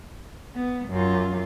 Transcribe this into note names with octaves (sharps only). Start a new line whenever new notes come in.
B3
F#2 F4